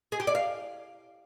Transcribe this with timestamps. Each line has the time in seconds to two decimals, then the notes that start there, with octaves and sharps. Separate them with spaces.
0.12 G#4
0.20 G4
0.27 D5
0.35 F5